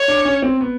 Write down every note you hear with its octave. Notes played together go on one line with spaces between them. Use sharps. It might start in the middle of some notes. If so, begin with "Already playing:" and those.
Already playing: C#5
D4
C#4
C4
B3